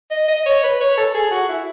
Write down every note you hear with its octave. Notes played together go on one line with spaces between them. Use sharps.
D#5
D#5
C#5
B4
C#5
A4
G#4
F#4
E4